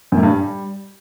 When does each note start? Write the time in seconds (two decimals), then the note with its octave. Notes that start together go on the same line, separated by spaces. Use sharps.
0.12 F#2
0.18 A2
0.23 G2
0.28 G3